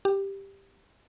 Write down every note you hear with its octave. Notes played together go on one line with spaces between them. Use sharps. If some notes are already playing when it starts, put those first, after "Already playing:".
G4